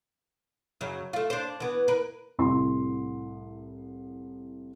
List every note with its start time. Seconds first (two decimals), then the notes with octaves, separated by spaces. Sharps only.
0.81 F#2 C#3 F#3
1.13 A3 F4
1.30 D4 C5
1.60 E3 B3
1.88 A#4 B4
2.39 C2 A2 C6